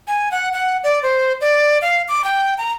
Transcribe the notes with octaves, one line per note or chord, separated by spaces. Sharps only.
G#5
F#5
F#5
D5
C5
D5
F5
D6
G5
A#5